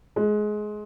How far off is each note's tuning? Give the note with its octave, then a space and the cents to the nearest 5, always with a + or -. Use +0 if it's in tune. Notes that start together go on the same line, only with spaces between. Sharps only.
G#3 +20